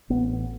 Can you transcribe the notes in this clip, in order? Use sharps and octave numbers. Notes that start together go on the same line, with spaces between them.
A1 B3